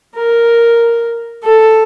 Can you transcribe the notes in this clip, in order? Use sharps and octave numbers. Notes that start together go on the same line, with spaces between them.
A#4
A4